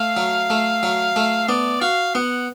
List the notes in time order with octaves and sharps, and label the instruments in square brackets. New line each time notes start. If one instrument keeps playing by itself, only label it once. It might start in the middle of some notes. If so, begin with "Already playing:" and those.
Already playing: [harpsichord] A3 [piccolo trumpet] F5
[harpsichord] F#3
A3
F#3
A3
[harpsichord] B3 [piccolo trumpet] D5
[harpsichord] F#4 [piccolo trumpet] F5
[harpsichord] B3 [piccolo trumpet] F#5